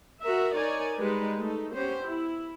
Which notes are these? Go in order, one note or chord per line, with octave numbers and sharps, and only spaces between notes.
F#4 A#4 E5
D#4 A#4 C#5 D5 G#5
G3 G#3 D#4 B4
A3 D#4 A4
B3 C#4 G4 C5
E4